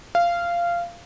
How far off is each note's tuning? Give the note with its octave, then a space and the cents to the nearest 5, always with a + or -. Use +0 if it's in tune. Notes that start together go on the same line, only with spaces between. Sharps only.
F5 -15